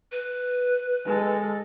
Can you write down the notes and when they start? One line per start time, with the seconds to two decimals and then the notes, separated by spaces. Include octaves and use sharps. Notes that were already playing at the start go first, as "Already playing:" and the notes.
0.12 B4
1.05 G#3 A4